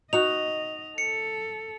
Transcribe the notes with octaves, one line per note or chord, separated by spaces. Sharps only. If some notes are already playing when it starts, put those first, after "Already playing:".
D#4 F#4 D#5 F7
A4 C#7